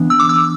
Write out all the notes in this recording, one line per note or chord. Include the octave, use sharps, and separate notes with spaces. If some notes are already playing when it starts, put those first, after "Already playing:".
Already playing: E3 B3 D4
E6
D6
E6